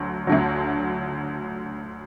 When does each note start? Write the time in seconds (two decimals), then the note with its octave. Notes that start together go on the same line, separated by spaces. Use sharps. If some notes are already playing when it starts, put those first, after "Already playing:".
Already playing: D2 D3 F#3
0.27 D2 D3 F#3